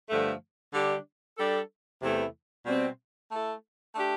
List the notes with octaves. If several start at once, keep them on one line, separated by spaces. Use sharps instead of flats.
G2 D3 F3 A3
D3 G3 D4 G4
G3 D4 A4
E2 C3 E3 A3 E4
B2 G3 C4
A3 E4 A4
A3 D4 G4